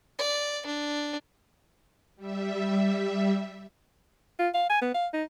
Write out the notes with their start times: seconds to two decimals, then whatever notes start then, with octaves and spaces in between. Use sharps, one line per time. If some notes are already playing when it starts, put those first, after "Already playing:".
0.19 D5
0.66 D4
2.16 G3 E5
4.39 F4
4.54 F5
4.70 G#5
4.82 B3
4.94 F5
5.14 D#4